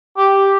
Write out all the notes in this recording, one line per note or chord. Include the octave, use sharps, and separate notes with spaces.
G4